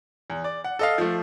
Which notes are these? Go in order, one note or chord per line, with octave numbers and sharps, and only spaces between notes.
E2
D5
F#5
A4 D#5 F5
F3 A3